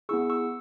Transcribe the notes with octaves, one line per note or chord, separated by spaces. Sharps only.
B3 E4 G#4 C#6 E6
C#6 E6